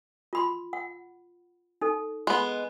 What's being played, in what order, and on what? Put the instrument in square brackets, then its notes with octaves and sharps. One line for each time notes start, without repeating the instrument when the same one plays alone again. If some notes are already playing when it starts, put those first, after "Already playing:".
[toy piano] F4 B5 C6
F#5
D#4 A4
[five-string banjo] G#3 B3